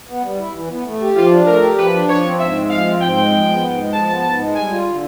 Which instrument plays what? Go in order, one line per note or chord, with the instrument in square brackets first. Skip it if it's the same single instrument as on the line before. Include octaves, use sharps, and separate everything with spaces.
[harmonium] B3
G3
E4
E3
B3
A3
G4
[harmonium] F3 [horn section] F4
[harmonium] D4
[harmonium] A3 [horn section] A#4
[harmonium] G4
[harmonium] F3 [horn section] B4
[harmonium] D4
[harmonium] F3 [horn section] C#5
[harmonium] C4
[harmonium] G#2 [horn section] E5
[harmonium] G#3
[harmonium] F3 [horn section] F5
[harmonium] C4
[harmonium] G#2 [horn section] G5
[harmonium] G#3
F3
B3
G#2
G#3
[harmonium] F3 [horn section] A5
[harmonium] B3
G#2
G#3
[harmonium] G3 [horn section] G#5
[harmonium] F4
D3